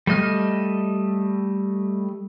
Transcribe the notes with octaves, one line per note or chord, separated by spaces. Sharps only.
G3 A3 D#5 F6